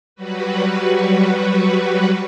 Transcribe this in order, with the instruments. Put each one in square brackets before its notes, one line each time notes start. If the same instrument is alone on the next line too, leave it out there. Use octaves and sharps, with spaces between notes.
[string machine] F#3 G3 F#4 B4